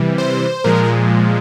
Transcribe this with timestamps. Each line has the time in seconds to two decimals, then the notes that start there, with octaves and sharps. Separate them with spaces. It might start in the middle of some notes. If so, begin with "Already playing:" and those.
Already playing: C3 E3 G3
0.18 C5
0.64 A#2 F3 G#3 A#4